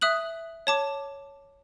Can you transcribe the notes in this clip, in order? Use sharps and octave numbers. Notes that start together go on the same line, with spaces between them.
E5 D#6 F#6 F#7
C#5 A5 D6